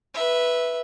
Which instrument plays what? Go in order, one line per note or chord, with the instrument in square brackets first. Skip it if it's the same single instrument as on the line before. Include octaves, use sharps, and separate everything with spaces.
[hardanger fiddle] B4 E5